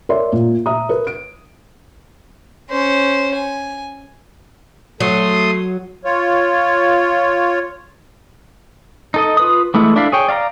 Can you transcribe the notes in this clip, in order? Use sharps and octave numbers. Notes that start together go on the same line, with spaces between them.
A#4 C#5 D5 E5 C6
A#2
E5 A#5 D#6
A#4 B4
D7
C#4 C5
G#5
F#3 A3 C6 D#6
F4 C#5
D#4 A4 D#5
F4 B4 D#6
E3 G#3 A3 E4
D4 E4 A4 E5 F5
G#4 C#5 G5
D5 F5 A5 A#5